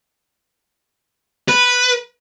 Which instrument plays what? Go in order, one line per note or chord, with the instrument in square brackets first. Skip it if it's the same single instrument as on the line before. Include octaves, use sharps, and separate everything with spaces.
[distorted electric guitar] B4